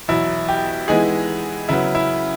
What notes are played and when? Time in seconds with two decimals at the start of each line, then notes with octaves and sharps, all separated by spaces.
0.08 E2 B2 F#3 E4
0.49 G4
0.88 E3 G#3 B3 D#4 G#4
1.69 C#3 F#3 B3 E4
1.95 E4